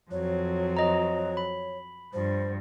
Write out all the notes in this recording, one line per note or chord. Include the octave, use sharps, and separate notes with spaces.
F2 F#3 C4 C#5
D#5 A#5
B5
G2 F3 C5